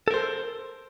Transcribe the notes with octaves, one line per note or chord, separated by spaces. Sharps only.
A4 A#4 C5